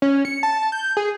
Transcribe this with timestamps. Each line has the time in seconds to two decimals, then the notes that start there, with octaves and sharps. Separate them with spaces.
0.02 C#4
0.25 C#7
0.43 A5
0.72 G6
0.97 G#4